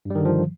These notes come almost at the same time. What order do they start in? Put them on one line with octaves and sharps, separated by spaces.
G2 G3 D#3 D3 F3